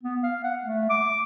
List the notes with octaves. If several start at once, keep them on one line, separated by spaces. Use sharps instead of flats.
B3
F5
F#5
A3
D6